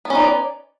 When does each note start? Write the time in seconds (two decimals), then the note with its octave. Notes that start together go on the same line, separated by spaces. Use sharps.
0.05 B3
0.10 C#4
0.15 D#4
0.20 D5